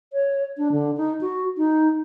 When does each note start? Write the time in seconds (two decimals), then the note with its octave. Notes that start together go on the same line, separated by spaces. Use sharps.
0.13 C#5
0.58 D4
0.72 D3
0.97 D#4
1.21 F#4
1.57 D#4